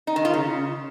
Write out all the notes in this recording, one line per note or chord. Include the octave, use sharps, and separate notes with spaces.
D#4
D#3
F4
C#3